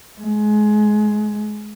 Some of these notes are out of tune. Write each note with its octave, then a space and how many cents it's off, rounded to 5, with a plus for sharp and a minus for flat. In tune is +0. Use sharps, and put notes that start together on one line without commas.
G#3 +25